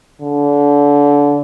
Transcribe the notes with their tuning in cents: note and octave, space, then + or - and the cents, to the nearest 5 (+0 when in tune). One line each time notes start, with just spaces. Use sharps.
D3 -30